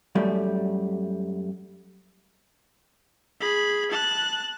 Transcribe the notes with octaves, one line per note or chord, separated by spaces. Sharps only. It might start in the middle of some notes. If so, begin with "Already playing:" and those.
F#2 G3 A3
G#4 B5
A5 F#6